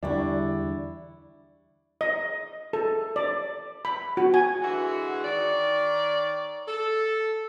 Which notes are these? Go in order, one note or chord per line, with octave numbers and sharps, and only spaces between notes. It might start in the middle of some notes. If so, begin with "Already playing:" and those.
E2 D3 G3 D4 E4 C#6
D#5
A4
D5
B5
F#4
G#5
D3 E3 G#3 F#4
D#3 C#5 D5
A4